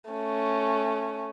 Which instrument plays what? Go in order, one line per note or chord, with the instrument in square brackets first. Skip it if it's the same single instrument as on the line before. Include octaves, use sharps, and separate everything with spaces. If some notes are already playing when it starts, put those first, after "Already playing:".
[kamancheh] A3 C#4